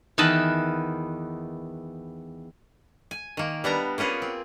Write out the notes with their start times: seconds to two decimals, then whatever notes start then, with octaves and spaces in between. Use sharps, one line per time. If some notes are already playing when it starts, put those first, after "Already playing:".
0.18 E2 D#3 B4 D#5 A5 B5
3.11 G#5
3.37 D#3 A#3
3.64 G3 B3 D4 A#5
3.98 A#3 B3 C#4 F4 G#4
4.22 C4